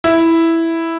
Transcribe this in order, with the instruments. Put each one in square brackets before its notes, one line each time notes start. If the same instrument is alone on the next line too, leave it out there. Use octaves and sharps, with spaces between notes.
[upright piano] E4